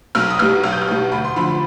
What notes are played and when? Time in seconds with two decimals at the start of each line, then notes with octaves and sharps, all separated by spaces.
0.15 B1 F6
0.30 D#6
0.39 B2 G3 F6
0.63 B1 F6
0.72 G6
0.81 F6
0.87 B2 G3
1.12 D2 B5
1.25 C6
1.36 D3 F3 B5